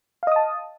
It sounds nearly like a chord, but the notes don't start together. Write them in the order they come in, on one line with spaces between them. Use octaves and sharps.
F5 D#5 D#6 A5